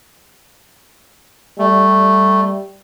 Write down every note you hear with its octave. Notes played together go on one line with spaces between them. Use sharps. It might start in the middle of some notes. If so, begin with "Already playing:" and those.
G3 A3